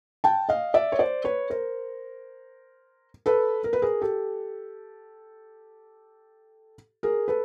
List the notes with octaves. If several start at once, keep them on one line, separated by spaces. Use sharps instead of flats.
G5 A5
D#5 F5
D5 E5
C#5
C5 D5
B4 C#5
A#4 C5
A4 B4
A#4
B4
G#4 A#4
G4 A4
G#4 A#4
A4 B4